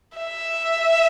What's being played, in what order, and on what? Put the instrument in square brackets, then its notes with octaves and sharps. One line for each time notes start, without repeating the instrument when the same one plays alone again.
[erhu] E5